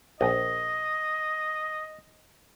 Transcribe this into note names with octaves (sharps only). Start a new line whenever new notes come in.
A#1 D#5